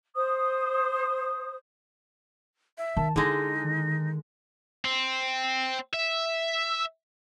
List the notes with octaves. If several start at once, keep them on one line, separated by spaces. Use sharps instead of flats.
C5 D#6
E5
D#3 A5
D3 G#3 D#4 E4 G#4
D#3
C4
E5